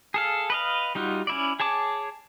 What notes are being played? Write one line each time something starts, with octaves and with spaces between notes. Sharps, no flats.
G#4 A4 F5
B4 D#5 F5
G3 D#4 F4 F#4
C#4 E4 D5
G#4 C#5 A5 D6